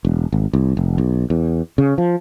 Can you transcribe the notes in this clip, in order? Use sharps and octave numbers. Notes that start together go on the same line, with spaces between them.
E1
G#1
C2
F1
B1
E2
C#3
F3